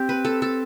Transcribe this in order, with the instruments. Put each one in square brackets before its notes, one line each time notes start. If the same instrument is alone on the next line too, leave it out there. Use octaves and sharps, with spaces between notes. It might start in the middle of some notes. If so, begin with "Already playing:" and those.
Already playing: [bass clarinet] C4 [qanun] G4
[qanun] B4
A4
A4